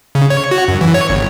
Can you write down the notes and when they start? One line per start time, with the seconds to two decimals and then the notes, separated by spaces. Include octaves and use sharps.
0.15 C#3
0.30 C#5
0.51 F#4
0.68 F#2
0.81 E3
0.94 C#5
1.09 G1